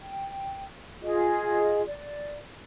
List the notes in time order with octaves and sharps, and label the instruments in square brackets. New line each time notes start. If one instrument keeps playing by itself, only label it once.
[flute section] G5
F4 G#4 D#5
D5